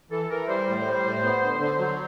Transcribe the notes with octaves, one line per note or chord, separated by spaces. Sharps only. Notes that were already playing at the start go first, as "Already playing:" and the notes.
E3 A4
E3 A#4
G3 C5
A2
G3
A2
B3
D3
D3
F#3